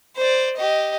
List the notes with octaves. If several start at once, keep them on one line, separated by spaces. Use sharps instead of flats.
C5 D5
G4 D#5